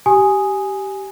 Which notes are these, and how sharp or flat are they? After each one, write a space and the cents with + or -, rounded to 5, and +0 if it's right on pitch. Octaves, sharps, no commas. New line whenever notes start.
G4 -15 G#5 +0 D#6 +0